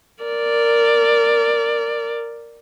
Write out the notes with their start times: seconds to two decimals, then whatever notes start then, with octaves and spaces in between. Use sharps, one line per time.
0.23 A#4 D5